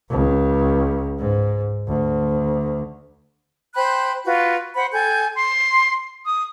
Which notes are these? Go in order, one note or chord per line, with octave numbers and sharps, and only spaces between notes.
C#2
G#2
D2
C5 G5 B5 F#6
F4 F#4 B4
C5 F#5 B5
A4 G5 G#5 G6
C6
D#6